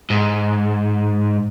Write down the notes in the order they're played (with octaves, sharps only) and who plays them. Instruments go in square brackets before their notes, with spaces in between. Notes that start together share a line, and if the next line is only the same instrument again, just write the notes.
[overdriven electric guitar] G#2